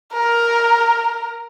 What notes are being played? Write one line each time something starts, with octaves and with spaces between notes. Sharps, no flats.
A#4